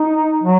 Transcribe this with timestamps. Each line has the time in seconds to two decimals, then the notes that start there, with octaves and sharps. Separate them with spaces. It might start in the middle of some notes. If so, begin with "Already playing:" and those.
Already playing: D#4
0.43 F#3